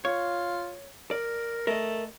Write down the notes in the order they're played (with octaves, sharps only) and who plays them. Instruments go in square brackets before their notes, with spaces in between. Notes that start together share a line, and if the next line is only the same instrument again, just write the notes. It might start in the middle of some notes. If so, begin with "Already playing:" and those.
[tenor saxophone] F4 [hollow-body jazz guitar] C#5
[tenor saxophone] A#4 [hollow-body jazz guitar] D5
[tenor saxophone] A3 [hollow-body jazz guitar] A#4 D#5